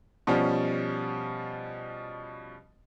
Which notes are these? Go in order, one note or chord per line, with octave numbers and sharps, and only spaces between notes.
B2 F3 G3 C#4